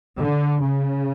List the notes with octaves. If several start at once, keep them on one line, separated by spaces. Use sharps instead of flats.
D3
C#3